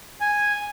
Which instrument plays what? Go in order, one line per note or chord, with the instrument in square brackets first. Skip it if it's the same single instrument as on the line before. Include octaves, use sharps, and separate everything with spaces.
[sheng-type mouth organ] G#5